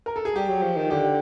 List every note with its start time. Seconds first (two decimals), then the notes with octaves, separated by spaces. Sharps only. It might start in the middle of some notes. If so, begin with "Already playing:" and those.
0.06 A#4
0.16 A4
0.25 G#4
0.35 G3 G4
0.48 F#3
0.62 F3
0.77 D#3
0.90 D3 G4